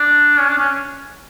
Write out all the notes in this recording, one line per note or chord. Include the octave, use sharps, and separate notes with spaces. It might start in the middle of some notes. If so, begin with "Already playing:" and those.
Already playing: D4
C#4
D4
C#4